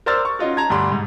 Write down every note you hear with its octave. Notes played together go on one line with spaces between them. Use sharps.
A#4 C5 D5 E6 F6 A6
C#6
C#4 D#4 F4 F#4
A5 A#5 G#6
D2 G2 D4 B5 C6
G#2